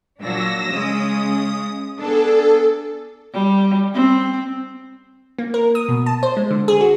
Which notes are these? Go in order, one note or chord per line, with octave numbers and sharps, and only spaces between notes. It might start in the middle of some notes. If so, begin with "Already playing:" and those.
A#2 F#3 D4 E6 A#6
C#3 G#3 C#4 D#6
B3 D4 G#4 A4
G3
C4
A#3
A#4
D#6
B2
A5
C5
G#3
D3
G#4
F#4